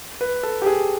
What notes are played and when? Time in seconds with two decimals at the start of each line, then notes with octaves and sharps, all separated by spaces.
0.21 B4
0.43 A4
0.62 G4
0.66 G#4